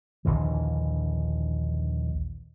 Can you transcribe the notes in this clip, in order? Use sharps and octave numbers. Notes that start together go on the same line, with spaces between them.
A#1 D#2 D3 E3